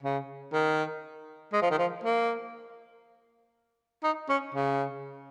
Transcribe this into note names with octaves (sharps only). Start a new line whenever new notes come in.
C#3
D#3
G#3
F3
D#3
F3
A#3
D#4
C#4
C#3